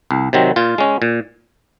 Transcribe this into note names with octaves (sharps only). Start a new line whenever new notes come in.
C2
C3 D#3 F#3 C4
A#2 F4
G#3 C#4
A#2